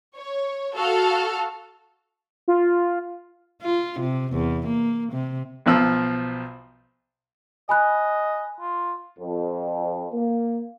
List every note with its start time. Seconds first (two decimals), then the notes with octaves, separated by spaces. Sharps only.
0.17 C#5
0.74 F#4 A4 F5
2.48 F4
3.62 F4
4.00 C3
4.32 E2
4.67 A#3
5.12 C3
5.66 B1 B2 F3 E6
7.69 D#5 G#5 B5 F#6
8.60 F4
9.19 F2
10.13 A#3